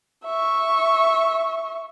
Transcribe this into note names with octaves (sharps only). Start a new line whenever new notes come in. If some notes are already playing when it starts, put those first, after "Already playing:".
E5 C#6